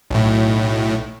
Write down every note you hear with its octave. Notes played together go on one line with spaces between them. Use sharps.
B1 A2